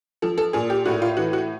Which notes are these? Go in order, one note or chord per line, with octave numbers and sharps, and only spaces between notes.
F3 A4
A4
A#2 G#4
G4
A2 F#4
F4
E3 F#4
F#4